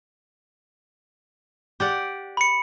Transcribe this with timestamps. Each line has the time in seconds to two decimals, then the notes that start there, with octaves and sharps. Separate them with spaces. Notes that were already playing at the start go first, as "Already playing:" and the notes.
1.80 G4 D5 F#5
2.37 B5 C#7